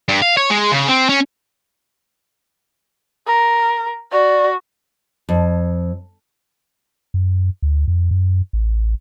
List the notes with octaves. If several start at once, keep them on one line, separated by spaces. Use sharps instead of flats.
G2
F5
C#5
G#3
C#3
C4
C#4
A#4
F#4 D5
F2
F#2
D2
F2
F#2
A1